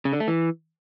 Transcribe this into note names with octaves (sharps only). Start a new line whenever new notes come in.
C#3
D3
A3
E3